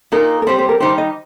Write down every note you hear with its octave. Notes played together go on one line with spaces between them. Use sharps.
A#2 A#3 D#4 A#4
A#4
G3 C4 G4 C5
C5
A#4
D#3 G3 D#4 G4 C5
D#5